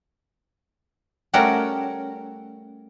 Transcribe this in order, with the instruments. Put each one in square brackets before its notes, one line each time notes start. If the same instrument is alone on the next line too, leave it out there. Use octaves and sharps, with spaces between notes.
[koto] G3 A3 C#4 F#4 A#4 F#5